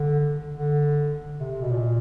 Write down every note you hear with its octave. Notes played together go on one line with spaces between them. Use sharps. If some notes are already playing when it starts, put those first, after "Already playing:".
Already playing: D3
D3
C3
C3
B2
A#2